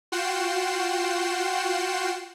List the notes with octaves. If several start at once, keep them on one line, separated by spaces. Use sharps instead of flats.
F4 F#4 F#5 G5 C7 E7